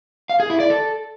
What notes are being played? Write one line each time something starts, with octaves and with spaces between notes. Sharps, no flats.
F5
G#4
E4
D5
A4